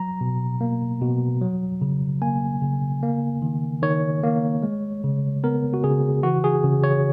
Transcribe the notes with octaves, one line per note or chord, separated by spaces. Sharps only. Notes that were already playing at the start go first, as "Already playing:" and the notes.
Already playing: F#3 A#5
B2
A#3
B2
F#3
C#3
A#3 G#5
C#3
A#3
D#3
D#3 C#5
A#3
G#3
C#3
B3 A#4
F#4
C#3 G#4
E3 F#4
G#4
C#3
C#5